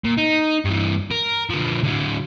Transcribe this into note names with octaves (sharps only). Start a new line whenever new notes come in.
A#2
D#4
G2 E3
A#4
D3 F3
D3 F#3